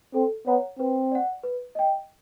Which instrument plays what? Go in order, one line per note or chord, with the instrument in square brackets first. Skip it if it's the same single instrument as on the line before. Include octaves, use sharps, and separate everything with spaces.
[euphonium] C4 [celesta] A4
[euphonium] B3 [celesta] C#5 F#5 A#5
[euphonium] C4 [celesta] B4
[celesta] D5 F#5
B4
D#5 G5